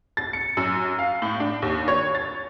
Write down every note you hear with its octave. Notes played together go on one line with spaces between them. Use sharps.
A6
C#7
F#2
F5
A2
D4
D#2
C#5
A6